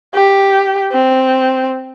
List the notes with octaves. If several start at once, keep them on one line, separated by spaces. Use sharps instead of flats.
G4
C4